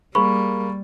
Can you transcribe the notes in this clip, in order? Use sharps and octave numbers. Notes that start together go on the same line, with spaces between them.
G3 A#3 G#4 B5 C#6